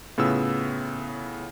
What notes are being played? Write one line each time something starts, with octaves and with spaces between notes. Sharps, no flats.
A2 C#3 B3 F4 E6